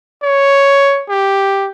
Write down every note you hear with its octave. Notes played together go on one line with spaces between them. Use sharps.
C#5
G4